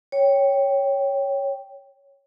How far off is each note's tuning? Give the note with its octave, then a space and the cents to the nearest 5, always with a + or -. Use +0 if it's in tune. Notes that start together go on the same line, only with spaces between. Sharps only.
C#5 +0 G5 +0